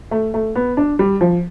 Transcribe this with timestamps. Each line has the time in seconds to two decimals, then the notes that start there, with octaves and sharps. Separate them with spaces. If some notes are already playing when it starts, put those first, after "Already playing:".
0.11 A3
0.34 A3
0.55 B3
0.77 D4
0.99 G3
1.21 F3